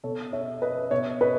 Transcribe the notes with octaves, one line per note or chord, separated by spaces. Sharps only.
B2 A4 C#5
C#5 E5
B4 D#5
B2 C#5 E5
B4 D#5